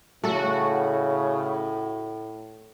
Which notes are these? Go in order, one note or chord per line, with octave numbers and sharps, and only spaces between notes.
A2 C#3 A3 F#4 A4